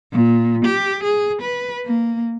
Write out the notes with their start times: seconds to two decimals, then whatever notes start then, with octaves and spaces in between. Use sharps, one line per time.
0.13 A#2
0.65 G4
1.03 G#4
1.42 B4
1.85 A#3